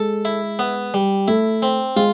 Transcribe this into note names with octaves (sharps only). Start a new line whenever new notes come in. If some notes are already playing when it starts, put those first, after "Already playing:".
Already playing: G#3 A4
E4
B3
G3
A3 E4
C4
G#3 F4